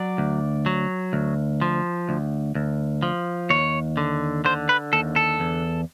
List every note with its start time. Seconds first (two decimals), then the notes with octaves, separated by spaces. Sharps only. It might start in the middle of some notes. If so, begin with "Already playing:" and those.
Already playing: F#3 D5
0.18 D2
0.66 F#3
1.13 D2
1.62 F3
2.09 D2
2.55 D2
3.03 F3
3.50 D#2 C#5
3.97 D3
4.45 D3 C5
4.69 B4
4.93 D#2 A4
5.16 A4
5.40 E2